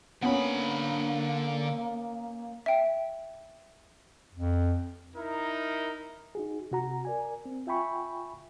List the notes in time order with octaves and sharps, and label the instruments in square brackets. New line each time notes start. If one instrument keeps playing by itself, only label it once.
[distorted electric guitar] D3 B5 [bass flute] A#3 [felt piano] B3 C#4
[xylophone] E5 G5
[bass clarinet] F2
[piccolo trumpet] D#4 [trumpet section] E4 A#4
[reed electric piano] D#4 F#4 G#4
C3 F#4 A#5
A#4 D5 G#5
C4
F4 E5 G5 G#5 B5 C#6